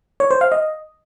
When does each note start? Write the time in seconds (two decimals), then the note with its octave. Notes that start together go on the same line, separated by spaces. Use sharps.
0.20 C#5
0.31 C5
0.41 F5
0.52 D#5